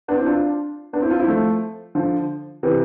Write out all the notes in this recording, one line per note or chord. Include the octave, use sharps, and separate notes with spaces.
B3 D4
C4 E4
D4 F4
B3 D4
C4 E4
D4 F4
C4 E4
F3 A3
D3 F3
C3 E3